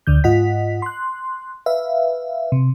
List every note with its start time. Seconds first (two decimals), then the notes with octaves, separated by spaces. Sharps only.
0.07 D2 D3 G6
0.24 G#2 F4 D#5 F#5 B6
0.82 C6 F#6
1.66 B4 E5 F5
2.52 C3